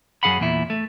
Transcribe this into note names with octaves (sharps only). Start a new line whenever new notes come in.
F#2 A#3 G#4 F5 F#5 B5
E2 A#2 E4
A3